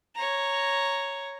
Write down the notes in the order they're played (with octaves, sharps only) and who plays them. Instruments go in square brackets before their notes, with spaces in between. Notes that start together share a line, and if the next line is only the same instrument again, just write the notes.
[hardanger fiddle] C#5 A#5